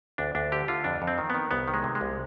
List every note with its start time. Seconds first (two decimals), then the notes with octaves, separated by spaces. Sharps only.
0.18 D2 D4
0.35 D2 D4
0.52 D3 G4
0.68 D3 F4
0.84 F2 D4
1.02 F2
1.07 C4
1.18 D#3
1.30 D#3 B3
1.51 C2 B3
1.68 D#3
1.74 G#3
1.84 C3
1.95 G#3
2.01 C2